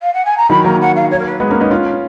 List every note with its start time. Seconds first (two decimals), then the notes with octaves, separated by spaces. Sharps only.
0.01 F5
0.14 F#5
0.25 G#5
0.37 A#5
0.50 D#3 F#3 B5
0.64 F#3 A#3 A#5
0.81 F#5
0.95 F5
1.11 C#5
1.19 A#4
1.25 B4
1.40 G#3 B3
1.50 A#3 C#4
1.60 B3 D#4
1.70 C#4 F4